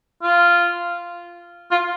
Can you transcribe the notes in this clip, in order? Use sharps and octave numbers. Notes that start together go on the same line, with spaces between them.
F4
F4